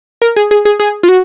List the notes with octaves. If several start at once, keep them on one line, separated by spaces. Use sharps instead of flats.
A#4
G#4
G#4
G#4
G#4
F4
F#4